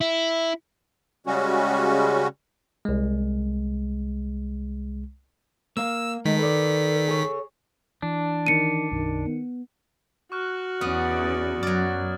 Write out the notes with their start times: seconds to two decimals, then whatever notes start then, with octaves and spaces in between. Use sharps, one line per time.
0.01 E4
1.27 C#3 G3 G#3 C#4 F#4
2.85 C2 G#3
5.77 A#3 A#4 F5 E6
6.25 D#3 G#3 A4 D#5 B6
6.38 A4 B4 D5
7.09 G#4 C#5
8.02 E3 D4
8.47 D#3 C#7 D#7
8.91 B1 F#2 D#3
9.27 B3
10.32 F#4 C#6 F6 F#6
10.81 E2 B3 C#4 D5 D#6
11.63 F#2 F#3 D5 F6 A6